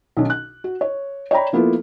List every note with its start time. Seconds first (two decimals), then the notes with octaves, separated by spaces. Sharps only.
0.17 B1 D#3 C#4
0.30 F#6
0.64 F#4
0.81 C#5
1.31 C#5 D5 G5 A#5 B5
1.53 F3 A#3 B3 E4 F4 A4